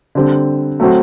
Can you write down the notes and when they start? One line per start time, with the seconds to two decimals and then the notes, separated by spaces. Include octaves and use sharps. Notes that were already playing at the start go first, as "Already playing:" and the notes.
0.15 D3 G3 C4
0.80 F#3 A3 C4 F#4